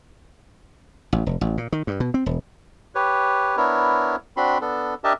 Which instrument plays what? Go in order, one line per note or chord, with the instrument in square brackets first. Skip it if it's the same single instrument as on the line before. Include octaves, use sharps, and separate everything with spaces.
[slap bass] A1
F1
A1
A#2
D#3
G2
B2
C4
E1
[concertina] G4 B4 C#5
B3 D4 E4 A#4 C#5
C4 D4 F#4 B5 C6
B3 D4 A4
D4 G4 A#4 D#5 E5 A5